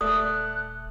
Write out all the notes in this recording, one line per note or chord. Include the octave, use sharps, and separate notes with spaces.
D#1 A3 D5 D#6 F#6